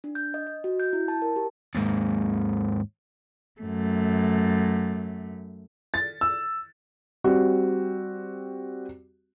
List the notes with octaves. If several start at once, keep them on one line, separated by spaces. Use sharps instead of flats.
D4
G6
D#5
D#5
F#4
G6
E4
A5
A#4
G4
D#2 G#2
F#2 A3
A6
E6
G3 C4 F#4